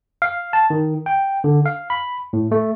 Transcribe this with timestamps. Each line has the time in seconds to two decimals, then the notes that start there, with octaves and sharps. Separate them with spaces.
0.22 F5
0.53 A5
0.70 D#3
1.06 G5
1.44 D3
1.66 F5
1.90 B5
2.33 A2
2.52 A3